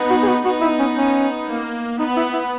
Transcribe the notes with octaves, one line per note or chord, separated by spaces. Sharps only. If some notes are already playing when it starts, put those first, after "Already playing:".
Already playing: B3 D#4
F#4
G#4
F#4
B3 D#4 F#4
E4
C#4
C#4
A#3
B3 D#4
E4
E4